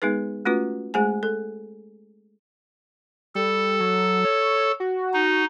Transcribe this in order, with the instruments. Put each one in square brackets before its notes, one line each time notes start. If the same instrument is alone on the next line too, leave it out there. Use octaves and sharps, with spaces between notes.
[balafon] G#3 B3 D#4 G#4 B4
A3 C#4 F4 F#4 B4
G#3 A3 G#4 C5 G#5
A4
[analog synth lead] G3 [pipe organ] A4
[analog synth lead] F#3
C#5
F#4
[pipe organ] D#4